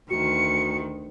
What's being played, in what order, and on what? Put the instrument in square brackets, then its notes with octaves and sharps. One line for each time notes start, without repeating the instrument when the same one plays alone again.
[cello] D2 D#3 [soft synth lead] F#4 [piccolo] C#7